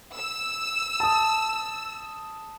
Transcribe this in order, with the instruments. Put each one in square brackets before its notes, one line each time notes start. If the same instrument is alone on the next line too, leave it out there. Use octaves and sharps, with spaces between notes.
[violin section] E6
[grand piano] A5 D#6